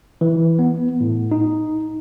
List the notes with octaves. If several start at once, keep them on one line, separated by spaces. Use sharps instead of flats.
E3
B3
A2
D#4